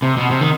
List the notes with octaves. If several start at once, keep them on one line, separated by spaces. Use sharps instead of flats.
C3
B2
C3
D#3